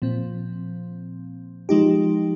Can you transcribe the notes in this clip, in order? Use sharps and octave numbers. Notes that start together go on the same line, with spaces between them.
A#2 F3 C4
F3 G#3 D#4 G4